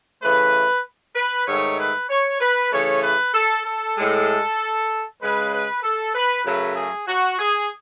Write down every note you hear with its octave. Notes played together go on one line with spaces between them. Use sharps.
C#3 E3 A3 B4
B4
G#2 D#3 A3 C#5
B4
C#5
B4
C#3 E3 A3 C#5
B4
A4
A4
A2 G#3
C#3 G#3 B4
B4
A4
B4
F#2 C#3 F#3 A3 B4
G#4
F#4
G#4